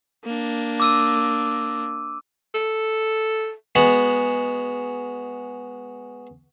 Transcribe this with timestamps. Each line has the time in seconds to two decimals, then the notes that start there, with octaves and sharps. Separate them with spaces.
0.24 A#3 D4
0.80 D6 E6 D#7
2.54 A4
3.75 G#3 B3 F#4